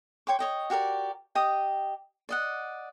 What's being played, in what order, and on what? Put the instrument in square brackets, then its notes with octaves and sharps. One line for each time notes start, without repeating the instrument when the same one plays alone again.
[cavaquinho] C#5 G5 C6 D6
C#5 D#5 G5
F#4 G4 A#4 D5
G4 D#5 G5 D#6
D5 D#5 F#5